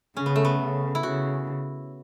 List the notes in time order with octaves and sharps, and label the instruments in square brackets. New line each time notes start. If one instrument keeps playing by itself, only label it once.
[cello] C#3 [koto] C#4
[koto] B3
A3
B3
[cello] C#3
[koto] E4
[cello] C#3 [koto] F#4